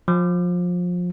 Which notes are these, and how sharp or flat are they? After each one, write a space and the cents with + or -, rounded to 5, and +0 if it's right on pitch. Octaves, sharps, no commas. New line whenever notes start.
F3 +25